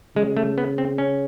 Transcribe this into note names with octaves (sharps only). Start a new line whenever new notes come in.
C#3 G#3
A3
B3
C4
C#4